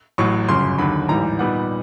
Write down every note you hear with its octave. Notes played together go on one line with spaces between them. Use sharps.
A1 A2 F#3 C#6
G1 F#2 C#3 C6
D#2 D3 F#3 B5
A1 G#2 E3 G3 A#5
A#2 G3 B3 D#4 F#5